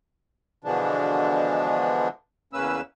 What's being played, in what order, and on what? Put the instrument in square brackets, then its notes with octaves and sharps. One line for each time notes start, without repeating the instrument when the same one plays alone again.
[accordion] B2 D3 E3 F3 G#3 D4
E2 C#3 A#3 C#4 B4 E6